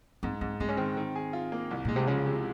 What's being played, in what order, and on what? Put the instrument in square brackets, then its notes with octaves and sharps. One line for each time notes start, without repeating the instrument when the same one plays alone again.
[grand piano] G#2 [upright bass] C4
[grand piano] G#2 [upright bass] C4
[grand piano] G#3 [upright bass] C4
[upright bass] C#4
[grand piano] D#3 [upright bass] C4
[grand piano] D#3
G#4
F4
A#3
C2
[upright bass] A#2 [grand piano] G#3
[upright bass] C3
[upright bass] C#3 [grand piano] F3
[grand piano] C3